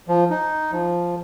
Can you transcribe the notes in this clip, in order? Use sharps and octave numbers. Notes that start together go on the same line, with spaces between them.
F3
D#4
F3